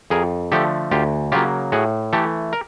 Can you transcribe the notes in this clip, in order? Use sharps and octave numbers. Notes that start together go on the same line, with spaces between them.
F2 G#4 A#4
D3 F3 A3 G4 A4
D2 F4 G4
C#3 F#3 A#3 F4 G4
A2 F#4 G#4
E3 A3 G4 A4
A#4